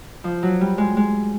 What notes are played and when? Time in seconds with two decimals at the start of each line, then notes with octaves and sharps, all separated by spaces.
0.24 F3
0.43 F#3
0.61 G3
0.78 G#3
0.97 G#3